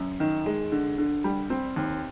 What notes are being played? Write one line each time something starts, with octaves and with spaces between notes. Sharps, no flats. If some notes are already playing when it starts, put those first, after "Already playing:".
Already playing: F#2
D#3
G#3
D3
D3
G3
C4
D#2